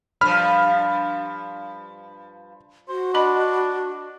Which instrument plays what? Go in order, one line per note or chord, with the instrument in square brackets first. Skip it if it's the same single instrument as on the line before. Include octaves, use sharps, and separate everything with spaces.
[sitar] G2 F3 [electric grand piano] B5 F6
[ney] F#4 [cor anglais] C5
[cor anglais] D4 [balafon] D#5 B5